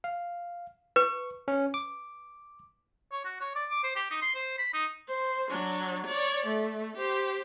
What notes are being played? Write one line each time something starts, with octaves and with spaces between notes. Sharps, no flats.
F5
B4 C#6
C#4
D6
C#5
F#4
C#5
D5
D6
C5
G4
D#4
C6
C5
B5
D#4
C5
F#3 D4
C#5 D5
A3
G4 C5